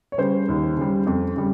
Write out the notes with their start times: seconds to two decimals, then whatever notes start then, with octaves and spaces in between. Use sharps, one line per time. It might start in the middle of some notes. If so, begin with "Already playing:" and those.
0.12 C#5
0.18 C#3 G3 C5
0.48 D#2
0.77 C#3 G3
1.07 F2
1.36 C#3 G3